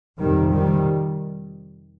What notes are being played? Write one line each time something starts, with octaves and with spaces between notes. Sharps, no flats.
F2 C3 D#3 G3
D#3 G3